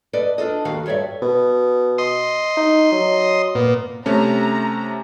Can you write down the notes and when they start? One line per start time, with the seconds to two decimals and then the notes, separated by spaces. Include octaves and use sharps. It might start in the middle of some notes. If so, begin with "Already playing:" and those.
0.13 A4 B4 D5 D#5
0.38 D4 F4 A4 D#5
0.65 D#2 D#3 F#4 F5
0.86 G2 A4 C#5 D5 E5
1.22 B2
1.98 D#5 C6
2.57 D#4
2.92 F#3
3.55 A#2 B3
4.06 C3 A3 C#4 A#5